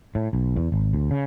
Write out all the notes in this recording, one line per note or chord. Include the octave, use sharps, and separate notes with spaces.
A2
B1
E2
G#1
D2
C#3